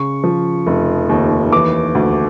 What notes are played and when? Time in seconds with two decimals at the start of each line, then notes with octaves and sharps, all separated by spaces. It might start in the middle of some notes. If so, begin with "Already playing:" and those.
Already playing: C#3 C#6
0.24 F3
0.67 F1
1.09 D#2
1.52 E3 D6
1.95 D2